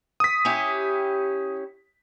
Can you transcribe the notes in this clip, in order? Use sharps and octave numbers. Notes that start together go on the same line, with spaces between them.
D#6 B6
C#4 E4 G4